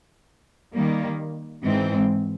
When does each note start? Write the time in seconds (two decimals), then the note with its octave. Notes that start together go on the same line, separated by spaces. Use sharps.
0.74 D#3 G3 A#3
1.63 G#2 E3 G#3 C4